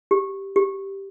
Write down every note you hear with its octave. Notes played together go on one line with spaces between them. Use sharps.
G4
G4